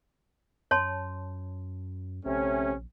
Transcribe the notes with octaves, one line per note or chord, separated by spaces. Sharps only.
F#2 C#5 A5 C6
A#1 C3 A3 C#4